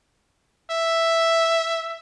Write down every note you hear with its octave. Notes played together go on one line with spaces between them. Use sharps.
E5